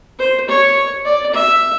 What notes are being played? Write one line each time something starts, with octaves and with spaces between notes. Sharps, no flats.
C5
C#5
D5
E5